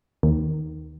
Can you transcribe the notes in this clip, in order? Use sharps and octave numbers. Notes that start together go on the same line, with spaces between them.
D#2 D#3